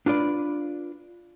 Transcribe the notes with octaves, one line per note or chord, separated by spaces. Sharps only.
D4 F4 B4 D5